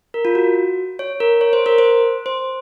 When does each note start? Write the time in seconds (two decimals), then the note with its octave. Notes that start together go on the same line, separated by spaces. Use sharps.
0.14 A#4
0.25 F4
0.35 F#4
0.99 C#5
1.20 A#4
1.41 C#5
1.53 C5
1.66 A#4
1.78 C5
2.26 C5